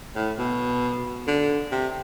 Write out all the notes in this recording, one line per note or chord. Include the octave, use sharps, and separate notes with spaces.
A2
B2
D3
C3